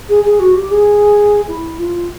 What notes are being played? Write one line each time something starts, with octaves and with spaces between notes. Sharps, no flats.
G#4
G#4
F#4
G4
G#4
E4
F4